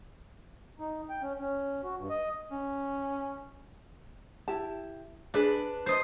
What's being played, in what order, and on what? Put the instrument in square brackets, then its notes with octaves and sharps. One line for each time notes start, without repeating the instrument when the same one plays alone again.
[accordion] D#4
G5
C#4
C#4
F#4
G2
D#5
[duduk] C#4
[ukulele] E4 G4 A5
[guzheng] D4 B4 [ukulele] G#4 D5
[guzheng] C5 D#5